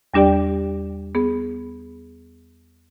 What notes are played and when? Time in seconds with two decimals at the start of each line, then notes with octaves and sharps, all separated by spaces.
0.14 E2 G3 D4 G4 D5 G5
1.15 B3 G#4